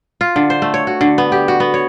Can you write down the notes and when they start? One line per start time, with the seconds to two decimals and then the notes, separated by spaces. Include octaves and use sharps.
0.21 F4
0.36 D3
0.50 C5
0.62 A3
0.74 C#5
0.87 F#4
1.01 D3
1.18 B3
1.32 G4
1.48 F#4
1.60 B3
1.74 C#5